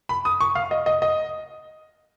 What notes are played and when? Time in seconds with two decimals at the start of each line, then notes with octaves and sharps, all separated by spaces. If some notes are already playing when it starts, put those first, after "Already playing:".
0.09 B5
0.25 D#6
0.41 C#6
0.55 F5
0.71 D#5
0.86 D#5
1.02 D#5